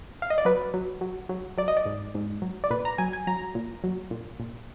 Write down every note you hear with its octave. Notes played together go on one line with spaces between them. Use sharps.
F5
D#5
D5
F#3 B4
F#3
F#3
F#3
F#3 D5
D#5
D5
G#2
G#2
F#3
D5
A#2 B4
A#5
F#3 G#5
G#5
F#3 A#5
A#2
F#3
A#2
A#2